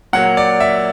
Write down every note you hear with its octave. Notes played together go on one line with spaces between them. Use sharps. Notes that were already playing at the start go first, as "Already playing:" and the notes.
A#2 F#3 A#3 F#5
D5
E5